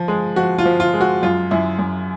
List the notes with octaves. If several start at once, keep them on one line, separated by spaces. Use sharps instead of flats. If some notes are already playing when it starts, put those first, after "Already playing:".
Already playing: F3
G#3
F3 F#4
F4
F3
F4
G#3
F#4
F#2 F4
F#2 E4
F#2